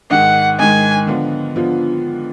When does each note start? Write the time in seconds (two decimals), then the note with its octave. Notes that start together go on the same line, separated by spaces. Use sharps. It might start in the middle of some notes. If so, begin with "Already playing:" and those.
0.10 G#2 D#3 G#3 F#5
0.59 G#2 D#3 G#3 G#5
1.07 D3 F3 B3 F4
1.56 D3 F3 B3 F4